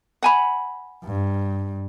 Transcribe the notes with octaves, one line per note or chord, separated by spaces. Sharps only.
F#5 G#5 B5
G2